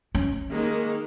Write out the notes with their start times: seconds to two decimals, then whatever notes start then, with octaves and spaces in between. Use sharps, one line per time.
0.15 C#4
0.50 D#3 G#3 A#3